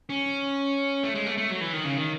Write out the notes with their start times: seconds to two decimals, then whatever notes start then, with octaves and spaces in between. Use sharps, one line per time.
0.09 C#4
1.03 A3
1.15 G#3
1.26 A3
1.38 A3
1.50 F#3
1.61 E3
1.73 D#3
1.84 C#3
1.97 D#3